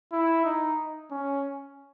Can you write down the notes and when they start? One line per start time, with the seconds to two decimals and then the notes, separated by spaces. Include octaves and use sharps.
0.12 E4
0.45 D#4
1.11 C#4